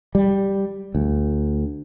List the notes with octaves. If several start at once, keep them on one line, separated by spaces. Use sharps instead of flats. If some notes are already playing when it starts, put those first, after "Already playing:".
G3
D2